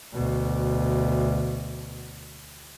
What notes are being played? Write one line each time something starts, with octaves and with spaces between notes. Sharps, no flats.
D2 B2